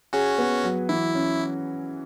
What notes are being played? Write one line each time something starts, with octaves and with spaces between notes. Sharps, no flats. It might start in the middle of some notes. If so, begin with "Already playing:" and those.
C#4 F#4 G#4
B3
F#3
E3 E4
C#4